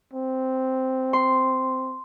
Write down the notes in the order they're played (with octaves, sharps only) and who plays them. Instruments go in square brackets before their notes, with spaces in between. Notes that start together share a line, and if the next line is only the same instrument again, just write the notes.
[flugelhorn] C4
[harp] C6